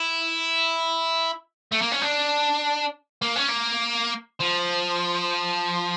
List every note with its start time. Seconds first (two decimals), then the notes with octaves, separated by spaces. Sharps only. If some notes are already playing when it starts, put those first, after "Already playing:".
Already playing: E4
1.72 A3
1.82 A#3
1.92 C#4
2.01 D4
3.22 A#3
3.36 C#4
3.49 A#3
4.40 F3